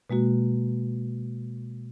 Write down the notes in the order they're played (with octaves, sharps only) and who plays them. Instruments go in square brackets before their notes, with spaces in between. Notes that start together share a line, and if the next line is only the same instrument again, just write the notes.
[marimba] B2 G#3 A#3 F#4